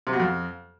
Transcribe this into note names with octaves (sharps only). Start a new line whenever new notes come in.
C3
B2
F2